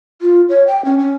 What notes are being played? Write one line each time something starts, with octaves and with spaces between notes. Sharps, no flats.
F4
C#5
G5
C#4
C#4